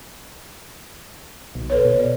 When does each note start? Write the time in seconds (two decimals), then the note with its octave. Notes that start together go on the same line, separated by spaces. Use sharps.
1.55 B1
1.70 A4 B4 C#5
1.85 B2
1.99 D5